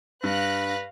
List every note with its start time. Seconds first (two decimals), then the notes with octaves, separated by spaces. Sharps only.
0.24 G2 B4 F5 F#6 A#6